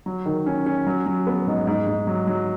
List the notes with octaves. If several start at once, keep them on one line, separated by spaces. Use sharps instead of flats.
F#3
D#3
C#4
C#4
F#3
F#3
B3
G#2
G#2
G#2
F#3
F#3